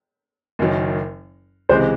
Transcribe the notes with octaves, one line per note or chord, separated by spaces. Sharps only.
F#1 F#2 D#3 F#3
C#2 C3 E3 G#3 C5